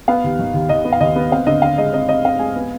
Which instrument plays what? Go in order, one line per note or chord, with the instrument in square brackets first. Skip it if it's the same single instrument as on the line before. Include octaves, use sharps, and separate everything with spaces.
[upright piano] B3 F5
D#2
D#3
D#2
D#2 D#5
B3
F5
D#2 D#5
B3
C4 F5
D3 D#5
D3 F5
G#3 D#5
C4 D#5
C4 D#5
C4 F5
G#3 G#5
B3